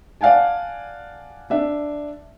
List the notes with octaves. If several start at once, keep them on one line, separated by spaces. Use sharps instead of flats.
D5 F5 F#5 G#5 A5
D4 E5